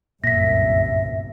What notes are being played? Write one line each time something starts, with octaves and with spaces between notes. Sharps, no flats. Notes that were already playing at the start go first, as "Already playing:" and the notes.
G1 C2 F#2 A#2 E5 A#6 B6